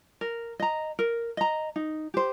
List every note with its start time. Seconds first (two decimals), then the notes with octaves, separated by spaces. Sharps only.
0.21 A#4
0.60 D#5 A#5
0.99 A#4
1.37 D#5 A#5
1.76 D#4
2.14 G4 C5